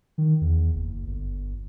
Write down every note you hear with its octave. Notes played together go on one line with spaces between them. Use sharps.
D#3
E2
F#1
G1